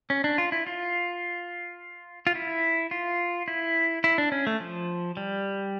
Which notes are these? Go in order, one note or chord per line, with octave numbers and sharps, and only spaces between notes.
C#4
D4
F4
E4
F4
F4
E4
F4
E4
E4
D4
C#4
A3
F3
G3